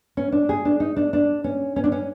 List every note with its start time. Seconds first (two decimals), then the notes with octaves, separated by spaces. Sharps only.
0.17 C#4
0.32 D4
0.49 G#4
0.65 D4
0.80 D#4
0.96 D4
1.13 D4
1.44 C#4
1.76 C#4
1.84 D4
1.92 C#4